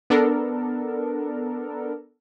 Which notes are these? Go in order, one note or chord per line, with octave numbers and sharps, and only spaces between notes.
B3 D4 A4 A#4